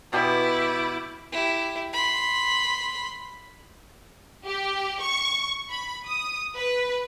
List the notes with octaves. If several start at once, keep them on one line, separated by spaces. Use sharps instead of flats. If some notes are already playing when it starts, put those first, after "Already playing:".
B2 E4 G4 D6
E4 G4
B5 C6
G4
C#6
B5
D#6
B4